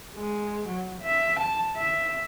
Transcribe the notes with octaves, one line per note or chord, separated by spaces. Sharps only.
G#3
F#3
E5
A5
E5